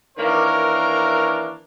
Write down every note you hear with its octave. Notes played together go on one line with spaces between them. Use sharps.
D#3 E3 A#3 D4 A#4 C#5